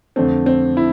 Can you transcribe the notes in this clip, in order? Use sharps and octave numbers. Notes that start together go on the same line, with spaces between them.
F2 D3 A3 C4
C4
E4